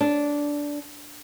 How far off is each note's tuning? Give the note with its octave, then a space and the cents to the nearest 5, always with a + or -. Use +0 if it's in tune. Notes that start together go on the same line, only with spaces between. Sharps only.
D4 -10